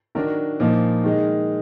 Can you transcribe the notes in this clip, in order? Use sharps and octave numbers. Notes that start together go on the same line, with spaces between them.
D#3 F#3 D4 A#4
A#2 F3 A#3 D#4
D#3 G#3 D#4